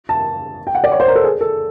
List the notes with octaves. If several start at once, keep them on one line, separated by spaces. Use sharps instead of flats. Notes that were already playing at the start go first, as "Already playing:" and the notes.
A5
G5
F#5
D5
C#5
C5
A#4
A4
G#4
A4